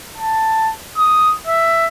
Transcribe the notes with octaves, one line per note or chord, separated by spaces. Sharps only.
A5
D#6
E5